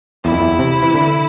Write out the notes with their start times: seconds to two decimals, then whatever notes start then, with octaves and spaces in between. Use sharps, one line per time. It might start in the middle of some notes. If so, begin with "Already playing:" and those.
0.24 E2 E4
0.32 F2
0.41 E2
0.59 C3
0.83 E3
0.94 D3